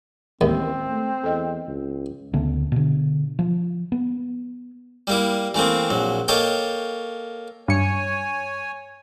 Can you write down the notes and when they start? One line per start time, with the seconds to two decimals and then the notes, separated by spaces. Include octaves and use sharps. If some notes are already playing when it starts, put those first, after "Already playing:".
0.41 A1 D#2 G#3 C4 A#4 E5
0.90 A3
1.24 E2 A4 D#5
1.67 C#2
2.33 D2 C#3 A3 B3
2.72 B2 D3
3.39 F3
3.92 B3
5.07 G3 A#3 E4
5.54 E3 A3 A#3 C4
5.90 A#1 F#3
6.28 A#3 A4 C#5 D#5 G5
7.68 G2 C#5 G#5 C#7